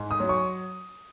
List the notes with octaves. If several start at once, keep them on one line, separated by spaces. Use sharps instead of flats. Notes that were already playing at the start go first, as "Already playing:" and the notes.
Already playing: G#2
D#6
F#3
C#6